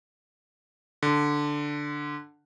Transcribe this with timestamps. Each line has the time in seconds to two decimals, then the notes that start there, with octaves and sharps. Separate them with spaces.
1.03 D3